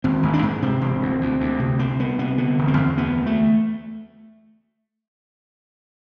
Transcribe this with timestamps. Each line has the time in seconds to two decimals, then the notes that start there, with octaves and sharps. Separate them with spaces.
0.04 G#1 C4
0.23 G#1
0.33 D4
0.42 G#2
0.62 C3 C4
0.81 E1
1.01 D2
1.21 D2
1.40 D2
1.59 C3
1.79 C2 C4
1.99 C2 B3
2.18 C3 B3
2.38 D3 B3
2.58 E1
2.68 C4
2.77 E2
2.97 D2 B3
3.17 D2
3.26 A3